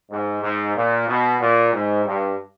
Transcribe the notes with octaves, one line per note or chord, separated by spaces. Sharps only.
G#2
G#2
A#2
B2
A#2
G#2
G2